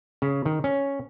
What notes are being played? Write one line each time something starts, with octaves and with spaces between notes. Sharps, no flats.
C#3
D#3
C#4